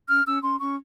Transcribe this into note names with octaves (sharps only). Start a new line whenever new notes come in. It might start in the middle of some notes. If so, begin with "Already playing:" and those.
C#4 F6
C#4 E6
C#4 C6
C#4 C#6